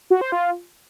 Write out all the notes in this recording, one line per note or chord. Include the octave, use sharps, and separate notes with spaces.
F#4
C5
F4